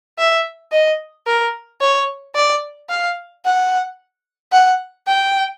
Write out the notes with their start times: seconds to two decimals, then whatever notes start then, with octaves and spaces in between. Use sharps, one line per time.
0.18 E5
0.72 D#5
1.27 A#4
1.81 C#5
2.35 D5
2.89 F5
3.45 F#5
4.52 F#5
5.07 G5